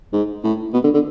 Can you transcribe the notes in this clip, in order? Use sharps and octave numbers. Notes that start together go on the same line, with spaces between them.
G#2
A2
B2
D3
D3